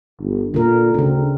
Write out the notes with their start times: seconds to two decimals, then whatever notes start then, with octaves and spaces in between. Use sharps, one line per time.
0.21 G1
0.54 A#2 D3 A#4
0.94 D2 C#3 C4